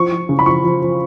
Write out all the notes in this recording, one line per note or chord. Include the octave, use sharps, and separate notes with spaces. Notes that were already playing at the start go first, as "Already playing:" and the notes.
Already playing: F3 C#6
F3
C#3
B5
F3 C#6
F3
F3